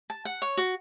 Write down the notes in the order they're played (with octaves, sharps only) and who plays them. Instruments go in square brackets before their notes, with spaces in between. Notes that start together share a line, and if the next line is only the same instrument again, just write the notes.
[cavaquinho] A5
F#5
C#5
F#4